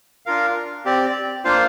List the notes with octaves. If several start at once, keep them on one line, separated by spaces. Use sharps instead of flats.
D4 F4 A#4 F5
C4 G4 D5
A#3 D4 F4 C5 F5